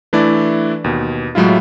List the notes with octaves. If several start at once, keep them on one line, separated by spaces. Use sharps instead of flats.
E3 A3 D4 E4 D5
D#2 B2
A2 F#3 G#3 E4 F4